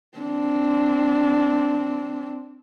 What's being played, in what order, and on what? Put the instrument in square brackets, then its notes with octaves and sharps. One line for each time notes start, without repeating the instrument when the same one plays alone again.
[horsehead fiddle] C4 D4